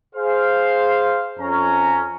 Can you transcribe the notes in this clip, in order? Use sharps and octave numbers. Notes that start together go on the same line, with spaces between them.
G#4 C5 F5
F2 C#4 A#5